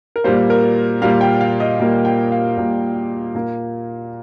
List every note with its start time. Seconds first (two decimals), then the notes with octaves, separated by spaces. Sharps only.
0.16 A#4
0.24 A#2 G3 A#3 C5
0.50 A#4
1.02 A#2 G3 A#3 F5
1.21 G5
1.40 F5
1.60 D#5
1.80 A#2 G3 A#3
2.05 G5
2.32 F5
2.57 A#2 G3 A#3
3.35 A#2 A#3